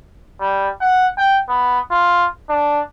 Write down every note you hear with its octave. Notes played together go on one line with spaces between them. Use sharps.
G3
F#5
G5
B3
F4
D4